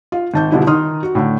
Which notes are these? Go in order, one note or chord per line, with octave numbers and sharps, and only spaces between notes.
F4
G#1 A5 G6
B2 D3 G3 D4 E4 F4
D#3 D#4 C6 D#6 F6
F#4
A2 D3